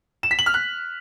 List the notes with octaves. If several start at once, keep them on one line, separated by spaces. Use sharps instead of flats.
E7
B6
F#7
F6
F#6